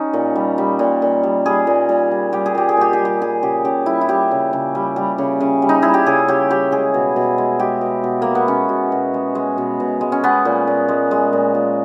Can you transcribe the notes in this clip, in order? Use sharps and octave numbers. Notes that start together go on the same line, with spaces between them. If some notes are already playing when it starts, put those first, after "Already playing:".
Already playing: G3 C#4 D#4
A#2
G3
G3
A#2
A#2
G3
G3 G#4
A#2
A#2
G3
G3 G4
G#4
A#2 G4
G#4
A#2 G4
G#4
G3
G4
G3 G#4
C#3 G4
C#3 G4
G3 E4
E4
G3 G4
C#3
C#3
G3
G3
C#3
C#3
G3
D#4
G3 E4
G4
C#3 G#4
C#3 G4
G3 G4
G#3 G#4
B2
B2
G#3
G#3 G4
B2
B2
G#3 A#3
B3
G#3 C#4
B2
B2
G#3
G#3
B2
B2
G#3
C#4
G#3 B3
A#2
A#2
G#3
G#3
A#2
A#2